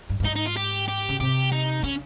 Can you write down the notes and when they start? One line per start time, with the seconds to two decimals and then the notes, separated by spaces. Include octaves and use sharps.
0.10 G2
0.20 G2
0.24 G#2 D#4
0.35 D#4
0.46 F4
0.57 G4
0.88 G4
1.09 C#3
1.20 C3 G4
1.52 D#4
1.83 C#3 C#4